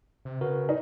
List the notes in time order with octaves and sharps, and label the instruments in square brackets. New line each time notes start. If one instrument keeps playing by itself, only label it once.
[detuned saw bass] C3
[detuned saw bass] C#3 [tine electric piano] F#4 A#4 B4
[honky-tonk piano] D#4